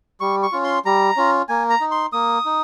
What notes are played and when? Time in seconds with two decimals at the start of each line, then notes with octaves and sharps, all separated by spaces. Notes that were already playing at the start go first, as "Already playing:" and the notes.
0.20 G3 C#6
0.43 C#6
0.52 C#4 F4
0.64 C6
0.85 G3 A#5
1.17 C#4 F4
1.49 A#3 G#5
1.70 A#5
1.81 D#4
1.91 C6
2.13 A#3 D#6
2.45 D#4